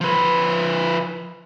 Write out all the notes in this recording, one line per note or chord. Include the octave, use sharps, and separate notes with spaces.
F3 B4